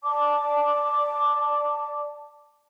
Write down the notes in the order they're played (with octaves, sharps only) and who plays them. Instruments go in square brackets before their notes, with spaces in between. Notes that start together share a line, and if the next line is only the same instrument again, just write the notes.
[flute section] D5 A5 D6